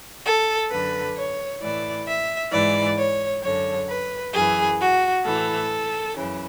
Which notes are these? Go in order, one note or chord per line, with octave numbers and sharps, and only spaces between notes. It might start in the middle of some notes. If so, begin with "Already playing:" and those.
A4
F#2 D3 B4
C#5
A2 E3 D5
E5
G#2 E3 D5
C#5
F#2 D3 C#5
B4
F#2 E3 G#4
F#4
A2 E3 A4
F#2 C#3 E3